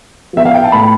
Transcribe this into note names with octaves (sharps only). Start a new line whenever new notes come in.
F3 B3 E5
F5
G5
A5
A2 B5